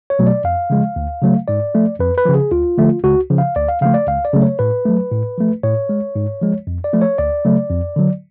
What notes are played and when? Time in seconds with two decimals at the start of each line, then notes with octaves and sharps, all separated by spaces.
0.10 C#5
0.19 B2 F#3 A3
0.27 D5
0.44 F2 F5
0.70 C#3 F3 G#3
0.96 D2
1.22 C#3 F#3 A3
1.48 G#2 D5
1.75 F3 A3
2.00 F2 B4
2.18 B4
2.26 C#3 F3
2.35 G#4
2.52 D2 F4
2.78 D3 F3 A3
3.04 C#2 F#4
3.30 C#3 F3
3.38 F5
3.56 D2 D5
3.68 F5
3.82 C#3 F3 A3 F5
3.94 D5
4.07 C#2 F5
4.25 D5
4.33 C#3 F#3 A3
4.42 C#5
4.59 A2 B4
4.86 F#3 A3
5.11 A2
5.37 F3 A3
5.63 A2 C#5
5.89 G#3
6.15 G#2
6.41 F3 G#3
6.67 F2
6.84 D5
6.93 F3 A3
7.02 C#5
7.18 D2 D5
7.45 C#3 F#3 A3
7.70 F2
7.96 D3 F#3